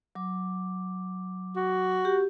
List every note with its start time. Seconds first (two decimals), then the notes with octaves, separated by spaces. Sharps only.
0.15 F#3 D6
1.56 F#4
2.05 G4